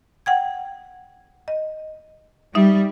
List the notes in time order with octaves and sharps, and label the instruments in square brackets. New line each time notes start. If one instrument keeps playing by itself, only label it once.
[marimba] F#5 G5 G#6
D#5
[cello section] G3 [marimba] D#4 E5